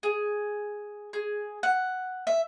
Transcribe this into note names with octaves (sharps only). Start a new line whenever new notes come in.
G#4
G#4
F#5
E5